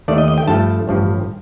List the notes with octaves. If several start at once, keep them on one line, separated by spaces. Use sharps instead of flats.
D#2 D#3 A3 D5
D#5
D#5
G5
G2 F3 A3 A5
A1 G2 F3